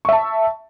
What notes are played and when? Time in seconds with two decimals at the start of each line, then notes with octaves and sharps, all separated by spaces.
0.05 C#6
0.09 E5
0.12 A5